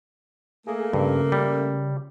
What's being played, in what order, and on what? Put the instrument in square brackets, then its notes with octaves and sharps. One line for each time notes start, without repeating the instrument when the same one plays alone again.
[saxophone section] A3 A#3 [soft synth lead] G#4
[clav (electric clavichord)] G2 [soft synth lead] C#3
[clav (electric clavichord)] G3